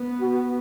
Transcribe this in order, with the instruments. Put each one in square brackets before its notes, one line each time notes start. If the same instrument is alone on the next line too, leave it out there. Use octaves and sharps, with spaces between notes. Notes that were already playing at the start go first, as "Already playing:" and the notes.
Already playing: [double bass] B3
[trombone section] F#4